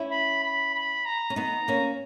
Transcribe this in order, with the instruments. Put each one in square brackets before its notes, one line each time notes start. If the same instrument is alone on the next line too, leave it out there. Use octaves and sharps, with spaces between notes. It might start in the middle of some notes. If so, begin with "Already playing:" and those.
Already playing: [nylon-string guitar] C#4 E4
[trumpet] B5
B5
B5
A#5
[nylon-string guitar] C#4
[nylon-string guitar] B3 D#4 [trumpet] A#5
[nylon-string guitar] A#3 C#4